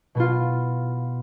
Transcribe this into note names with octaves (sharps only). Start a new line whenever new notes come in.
B2 B3 F4